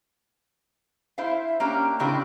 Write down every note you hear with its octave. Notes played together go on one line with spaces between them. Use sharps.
E4 C5 E5 F5
A#3 C#4 D4 G4
A2 C#3 C4 D4 G4